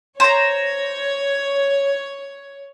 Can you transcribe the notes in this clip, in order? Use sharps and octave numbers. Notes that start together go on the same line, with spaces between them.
C5 C#5 A#5